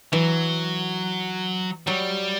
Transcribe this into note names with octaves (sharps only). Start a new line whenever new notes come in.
E3 F#3
F#3 G3